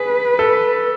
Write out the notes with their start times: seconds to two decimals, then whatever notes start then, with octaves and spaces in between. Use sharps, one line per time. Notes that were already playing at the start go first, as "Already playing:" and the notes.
Already playing: G#4 B4
0.39 A4